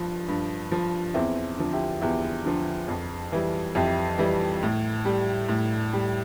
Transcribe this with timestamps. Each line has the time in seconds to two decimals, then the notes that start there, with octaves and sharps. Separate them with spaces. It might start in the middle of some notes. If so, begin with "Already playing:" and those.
Already playing: G2 F3
0.28 G2
0.72 F3
1.14 E2 C4 E4
1.58 D3 F3
1.73 E4 G4
2.01 E2 E4 G4
2.45 D3 F3
2.88 F2
3.32 E3 G3
3.75 F2 E4 G4
4.18 E3 G3
4.63 A2
5.05 G3
5.49 A2
5.93 G3